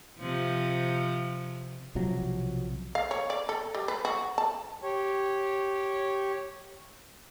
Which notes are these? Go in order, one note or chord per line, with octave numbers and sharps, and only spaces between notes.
C3 F3
B1 C3 F3 F#3
F5
C#5
D5
A4
G3
B4
F#4
A5
G4 C#5